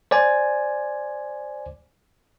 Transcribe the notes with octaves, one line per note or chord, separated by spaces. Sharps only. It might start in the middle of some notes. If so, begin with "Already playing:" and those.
C5 D5 G#5